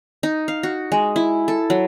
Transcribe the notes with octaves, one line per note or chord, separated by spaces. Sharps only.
D#4
F5
F#4
G#3
E4
A4
F#3